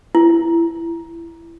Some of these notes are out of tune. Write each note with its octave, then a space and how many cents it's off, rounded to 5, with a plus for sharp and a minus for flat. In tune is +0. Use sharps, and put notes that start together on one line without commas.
E4 +20